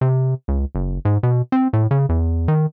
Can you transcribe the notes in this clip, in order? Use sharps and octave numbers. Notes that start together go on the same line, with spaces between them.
C3
C#2
F#1
G#2
B2
C4
A2
C#3
E2
D#3